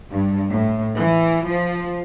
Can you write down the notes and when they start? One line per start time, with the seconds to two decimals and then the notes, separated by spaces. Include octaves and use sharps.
0.11 G2
0.50 A2
0.97 E3
1.47 F3